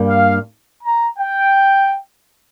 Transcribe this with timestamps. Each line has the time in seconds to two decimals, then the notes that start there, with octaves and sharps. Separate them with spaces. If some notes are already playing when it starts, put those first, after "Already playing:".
Already playing: G2 G3 A#3
0.08 F5
0.82 A#5
1.18 G5